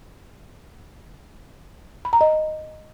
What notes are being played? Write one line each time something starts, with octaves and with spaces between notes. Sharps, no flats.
B5
A#5
D#5